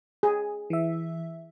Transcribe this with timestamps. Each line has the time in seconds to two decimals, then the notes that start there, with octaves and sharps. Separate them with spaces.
0.23 G#4
0.70 E3 E5